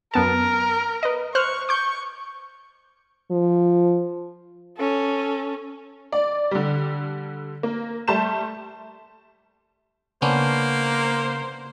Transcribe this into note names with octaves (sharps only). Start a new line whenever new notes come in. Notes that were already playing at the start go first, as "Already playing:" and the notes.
F#2 B3 A#4 A5
B4 D#5
C5 C#6 F6 F#6
C#6 D6 G6
F3
C#4 A4
D5
D3 G3
A#3
G3 A3 A5 C6 G6 E7
C#3 A#3 B3 C#4 D4 C5